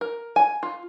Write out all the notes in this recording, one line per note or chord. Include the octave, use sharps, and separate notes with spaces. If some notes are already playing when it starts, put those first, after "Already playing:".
A#4
G#5
F4